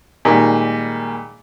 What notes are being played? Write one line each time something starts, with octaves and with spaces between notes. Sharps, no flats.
A#2 D#3 G3 G#3 G#4